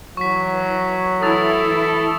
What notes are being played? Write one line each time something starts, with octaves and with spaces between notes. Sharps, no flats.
E3 F#3 C#6 B6
E3 E4 A4 D#6 A6 F7